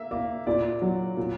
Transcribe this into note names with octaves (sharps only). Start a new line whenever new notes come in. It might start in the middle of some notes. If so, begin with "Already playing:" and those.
Already playing: A#3 E5
A#3
A#2 D5
F#3
A#2